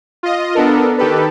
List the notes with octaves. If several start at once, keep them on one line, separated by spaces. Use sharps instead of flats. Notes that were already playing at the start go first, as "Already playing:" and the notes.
F4 D#5
B3 D4 A4 A#4
D#3 G4 A4 B4